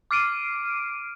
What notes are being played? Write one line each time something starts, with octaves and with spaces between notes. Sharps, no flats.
D6 F6 C7 D7 D#7